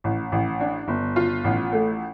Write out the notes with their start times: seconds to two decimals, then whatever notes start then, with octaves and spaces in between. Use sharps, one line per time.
0.04 A1
0.32 A1
0.60 D4
0.88 G1
1.16 F4
1.44 A1
1.73 A3